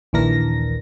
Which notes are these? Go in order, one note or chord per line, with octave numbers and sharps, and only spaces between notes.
A#1 D#2 E3 D4 A#4 A#6